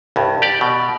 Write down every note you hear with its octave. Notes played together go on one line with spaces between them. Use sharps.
C2 G2
G4 D5
B2